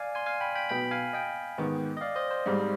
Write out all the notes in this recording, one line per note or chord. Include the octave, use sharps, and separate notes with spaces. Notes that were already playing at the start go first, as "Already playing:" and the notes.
Already playing: D5 F5 G#5
G#5 C6
F5 G#5
G5 B5
G5 B5
B1 B2 B3 G5 B5
F5 G#5
D#5 G5
G#2 D#3 B3
D#5
D5 F5
C5 D#5
C5
G#2 G3 C4